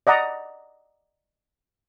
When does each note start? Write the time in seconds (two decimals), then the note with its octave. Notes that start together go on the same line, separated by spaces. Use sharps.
0.07 D5 D#5 F#5 A#5